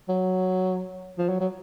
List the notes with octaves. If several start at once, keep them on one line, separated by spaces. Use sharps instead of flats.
F#3
F3
F#3
F#3